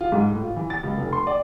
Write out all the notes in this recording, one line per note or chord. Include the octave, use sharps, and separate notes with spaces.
F4
G#2
A2
F4
E3
A6
C#2
F1
C6
D5